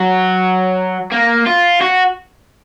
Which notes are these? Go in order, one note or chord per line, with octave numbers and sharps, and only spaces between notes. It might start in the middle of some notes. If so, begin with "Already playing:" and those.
Already playing: F#3
A#3
F4
F#4